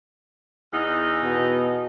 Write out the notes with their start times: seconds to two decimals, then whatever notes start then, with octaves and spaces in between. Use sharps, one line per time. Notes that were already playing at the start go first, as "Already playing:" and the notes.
0.73 E2 D#4 D#5
1.23 B2